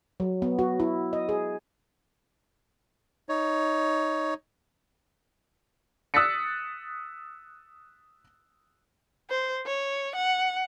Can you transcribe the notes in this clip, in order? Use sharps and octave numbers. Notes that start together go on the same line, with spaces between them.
F#3
B3
F#4
E4
D#5
G#4
D#4 C#5
D#6 E6 F#6 A6 B6 C#7
C5
C#5
F#5